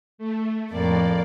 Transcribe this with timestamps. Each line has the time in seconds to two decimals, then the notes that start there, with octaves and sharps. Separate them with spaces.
0.18 A3
0.70 F2 A2 A#3 D5